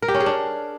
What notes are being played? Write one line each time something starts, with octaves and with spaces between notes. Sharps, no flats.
A#4
G4
C#4
G#4
D4